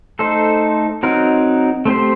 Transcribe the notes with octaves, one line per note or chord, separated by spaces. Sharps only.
A3 D#4 A4 C5
F#3 C4 D#4 F#4 A#4
A3 C4 G4 C5